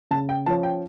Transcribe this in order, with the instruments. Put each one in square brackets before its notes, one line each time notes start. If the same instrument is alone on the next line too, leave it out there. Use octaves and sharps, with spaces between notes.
[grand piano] C#3 [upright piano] A5
[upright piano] G5
[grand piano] F3 C#4 [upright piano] A5
[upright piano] G5